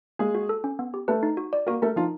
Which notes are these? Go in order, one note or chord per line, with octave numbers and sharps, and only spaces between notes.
G#3 A#3 G#4
F#4
A4
C#4
B3
G4
A3 A4 B4
D#4
F#4
D5
A#3 F#4 A#4
A3 A4 A#4
F3 D#4 F4